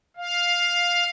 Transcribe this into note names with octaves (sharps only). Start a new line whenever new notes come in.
F5